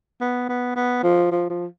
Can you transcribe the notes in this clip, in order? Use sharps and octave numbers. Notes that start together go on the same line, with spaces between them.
B3
B3
B3
F3
F3
F3